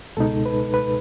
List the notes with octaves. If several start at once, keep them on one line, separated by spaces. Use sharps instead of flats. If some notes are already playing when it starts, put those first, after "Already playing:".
C#2 B2 G#3 D#4 A4
B4
B4